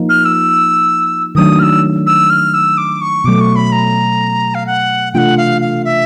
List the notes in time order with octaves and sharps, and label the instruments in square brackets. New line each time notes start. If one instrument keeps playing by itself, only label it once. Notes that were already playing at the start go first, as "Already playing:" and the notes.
Already playing: [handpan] F3 A#3 D#4
[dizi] F6
E6
[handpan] D#3 F#3 A3 D4 [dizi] D#6
[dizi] F6
E6
E6
F6
E6
D6
C#6
[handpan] B2 F#3 A3 [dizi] D6
[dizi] C#6
B5
A#5
F5
F#5
[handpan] C3 E3 A3 D4 F4 [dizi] F#5 G5
[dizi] F5
F5
E5